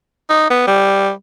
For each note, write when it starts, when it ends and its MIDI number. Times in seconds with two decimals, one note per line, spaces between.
0.30 0.48 63
0.50 0.67 59
0.67 1.10 55